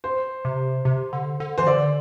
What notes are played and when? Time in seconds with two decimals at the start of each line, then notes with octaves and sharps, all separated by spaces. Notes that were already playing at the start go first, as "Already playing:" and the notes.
0.04 C5
0.45 C3
0.85 C3
1.13 D3
1.40 D3
1.58 E3 C5
1.67 D3 D5